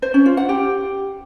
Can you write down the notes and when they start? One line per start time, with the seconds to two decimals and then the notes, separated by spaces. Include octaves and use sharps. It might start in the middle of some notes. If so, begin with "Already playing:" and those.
0.02 C5
0.14 C#4
0.26 F4
0.37 F#5
0.49 G4